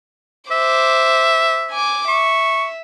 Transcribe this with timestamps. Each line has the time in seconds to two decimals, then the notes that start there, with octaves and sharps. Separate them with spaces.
0.51 C5 E5 D6
1.71 G#5 D6
2.08 E5 C#6